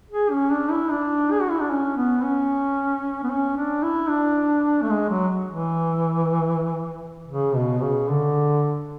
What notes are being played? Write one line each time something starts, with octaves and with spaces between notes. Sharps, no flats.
G#4
C#4
D4
E4
D4
G#4
F#4
E4
D4
C#4
B3
C#4
B3
C#4
D4
E4
D4
A3
G#3
F#3
E3
C#3
B2
C#3
D3